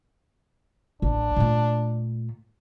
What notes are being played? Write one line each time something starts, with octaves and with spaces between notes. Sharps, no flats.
A1 D4
A#2 A3